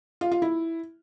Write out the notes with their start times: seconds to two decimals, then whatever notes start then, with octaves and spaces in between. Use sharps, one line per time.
0.21 F4
0.32 F4
0.42 E4